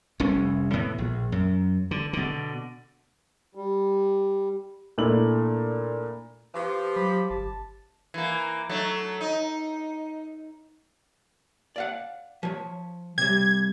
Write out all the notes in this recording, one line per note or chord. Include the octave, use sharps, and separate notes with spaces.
F1 C2 C#4
A2 E3 B3
A#1
F#2
D3
B2 D3
G3
A#2 A3 D4 E4 F#7
F3 G4 B4
F#3 B5
G1 A5
E3 A#3
F#3 A3 D4
D#4
D5 F5 F#5
F3 C#5
C3 G3 G#6